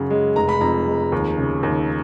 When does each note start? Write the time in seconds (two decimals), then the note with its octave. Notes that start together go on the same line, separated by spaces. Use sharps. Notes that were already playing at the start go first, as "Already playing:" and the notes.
Already playing: F#2 C#3 F#5
0.10 G#3
0.36 F1 A#5
0.49 B5
0.61 F2 A#5
0.87 G#3
1.12 D#2
1.38 C#3
1.63 D#2